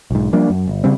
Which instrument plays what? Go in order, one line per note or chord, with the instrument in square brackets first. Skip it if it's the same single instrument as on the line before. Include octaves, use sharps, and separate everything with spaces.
[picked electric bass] B1 G#2
F3 G3 A#3 D4
F#2
G1
C#3 G3 C4